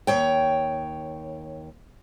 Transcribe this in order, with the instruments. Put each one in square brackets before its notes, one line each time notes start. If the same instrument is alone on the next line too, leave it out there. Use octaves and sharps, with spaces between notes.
[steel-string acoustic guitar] D#2 C#5 G5